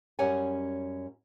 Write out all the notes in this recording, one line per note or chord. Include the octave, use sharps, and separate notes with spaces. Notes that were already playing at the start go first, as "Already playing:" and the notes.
F#2 G3 C#4 C#5 F#5 G#5